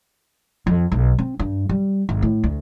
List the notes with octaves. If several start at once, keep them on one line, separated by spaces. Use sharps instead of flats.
F2
B1
C4
G2
G3
G#1
A2
D2